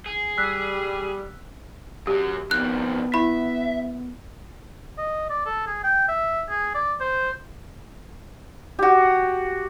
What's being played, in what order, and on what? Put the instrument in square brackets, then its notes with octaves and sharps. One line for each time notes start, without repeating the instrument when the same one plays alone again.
[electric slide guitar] G#4
[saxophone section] G3 [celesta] E6 F#6 B6
[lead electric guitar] F#2 F#3 [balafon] G4
[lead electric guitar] F2 D#3 [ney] B3 [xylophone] F#6
[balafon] E4 [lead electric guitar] E5 [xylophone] B5
[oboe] D#5
D5
A4
G#4
G5
E5
G#4
D5
C5
[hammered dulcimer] F#4 G4